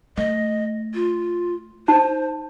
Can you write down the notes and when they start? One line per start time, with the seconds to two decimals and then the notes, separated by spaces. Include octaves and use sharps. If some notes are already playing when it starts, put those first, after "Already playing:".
0.17 A3 D#5
0.94 F4
1.88 D#4 C5 A5